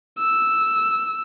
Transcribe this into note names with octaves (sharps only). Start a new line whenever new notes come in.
E6